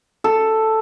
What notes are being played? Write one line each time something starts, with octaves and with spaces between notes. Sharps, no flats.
A4